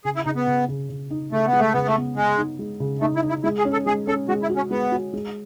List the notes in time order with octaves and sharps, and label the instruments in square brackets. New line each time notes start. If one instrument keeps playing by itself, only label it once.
[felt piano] C#3 [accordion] G#4
[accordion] E4
[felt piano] C#3 [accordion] D#4
[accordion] B3
[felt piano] C#3
C#3
C#3
D#4
[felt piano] C#3 [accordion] A3
[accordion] B3
[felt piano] G#3
[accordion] A3
[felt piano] C#3 [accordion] B3
[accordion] A3
[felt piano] B3
[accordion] G#3 [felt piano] B3
[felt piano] D#4
G#3
C#3
[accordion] A3 [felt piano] D#4
[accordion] E4
[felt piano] D#4
[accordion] E4
[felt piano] G#3 [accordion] E4
[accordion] G#4
[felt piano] C#4
[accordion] A4
[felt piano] G#3 [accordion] G#4
[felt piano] C#4 [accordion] A4
[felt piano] G#3 [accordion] F#4
[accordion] E4
[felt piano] F#4
[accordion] C#4
[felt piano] G#3 [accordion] B3
[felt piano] F#4
G#3